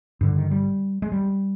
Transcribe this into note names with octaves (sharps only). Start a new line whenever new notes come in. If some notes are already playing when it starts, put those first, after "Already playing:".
G2 D3
D#3
G3
G#3
G3